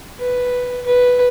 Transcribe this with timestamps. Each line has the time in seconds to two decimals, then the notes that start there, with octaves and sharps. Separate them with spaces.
0.20 B4
0.86 B4